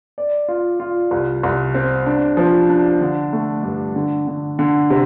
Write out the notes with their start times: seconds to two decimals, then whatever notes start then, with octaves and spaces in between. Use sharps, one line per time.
0.18 D5
0.48 F4
0.80 F4
1.11 C2
1.43 C2
1.75 C4
2.06 D4
2.37 F3
2.69 D4
3.01 D3
3.33 A3
3.63 G2
3.96 D3
4.27 D3
4.59 D3
4.90 C3